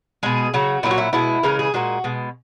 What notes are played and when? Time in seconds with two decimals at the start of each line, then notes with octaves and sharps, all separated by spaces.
0.23 B2 G#3 G#4
0.54 C#3 F#3 F#4
0.83 A#2 F#3 E4
0.91 F#4
0.98 E4
1.13 B2 G#3 E4
1.43 C#3 E3 G#3 A#4
1.59 G#4
1.74 A#2 G#3 F#4
2.04 B2 G#3